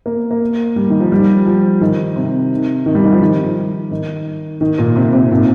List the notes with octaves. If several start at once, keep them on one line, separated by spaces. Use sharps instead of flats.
A#3
A#3
G3
D#3
F3
G3
F3
D#3
C3
D#3
G3
D#3
F3
D#3
D#3
D#3
A#2
C3
C3
A#2